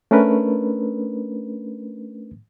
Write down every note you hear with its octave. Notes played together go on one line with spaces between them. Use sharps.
A3 C#4 D4 A#4 B4